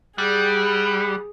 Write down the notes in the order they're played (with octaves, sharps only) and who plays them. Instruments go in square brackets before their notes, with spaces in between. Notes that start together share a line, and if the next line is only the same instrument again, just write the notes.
[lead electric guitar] G3 [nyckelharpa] G#4 [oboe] F#5